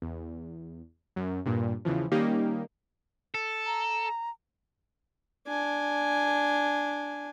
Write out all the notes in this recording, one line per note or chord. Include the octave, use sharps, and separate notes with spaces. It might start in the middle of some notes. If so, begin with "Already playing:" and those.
E2
F#2
G2 A#2
E2 C#3 E3 F3
D#3 G3 A#3 C#4 D#4 G4
A4
A#5
D4 G#5